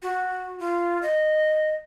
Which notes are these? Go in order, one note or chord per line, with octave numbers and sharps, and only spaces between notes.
F#4
F4
D#5